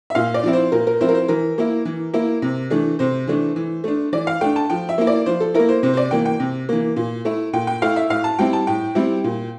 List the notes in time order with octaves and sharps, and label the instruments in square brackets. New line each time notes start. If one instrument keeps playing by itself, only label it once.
[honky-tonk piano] E5
A#2 F5
D5
F3 C4 E4
C5
A#2 A#4
A#4
F3 C4 E4 C5
A#4
C5
E3 A#4
A#3 E4
E3
A#3 E4
C3
E3 A3 D4
C3 C5
E3 A3 D4
E3
A3 D4
E3 D5
F5
A3 D4 G5
A5
F3 G5
E5
A#3 E4
D5
F3 C5
A4
A#3 E4 A#4
C5
C3 C5
C5
D5
E3 A#3 G5
G5
C3
E3 A#3
A#2
A3 E4
A#2 G5
G5
A3 E4 F5
E5
A2 F5
A5
G3 C4 E4 G5
A5
A2 G5
G3 C4 E4
A#2